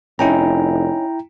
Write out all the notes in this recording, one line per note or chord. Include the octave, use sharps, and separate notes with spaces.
F1 C#4 D#4 E4 G5 A#5